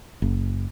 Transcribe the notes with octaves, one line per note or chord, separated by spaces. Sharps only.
F#1